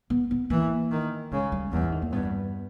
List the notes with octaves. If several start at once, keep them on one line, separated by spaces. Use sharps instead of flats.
B3
B3
E3 A#3
D#3
C#3 G#3
G3
E2 G3
E3
D#3
A#3
G2 B3